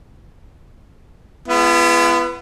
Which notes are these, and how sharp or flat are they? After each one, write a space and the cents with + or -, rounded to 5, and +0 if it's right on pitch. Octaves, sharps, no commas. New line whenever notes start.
G#3 +0 B3 +0 E4 +45